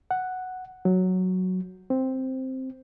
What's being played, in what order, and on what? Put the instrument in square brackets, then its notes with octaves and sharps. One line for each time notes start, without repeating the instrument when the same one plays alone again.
[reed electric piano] F#5
F#3
C4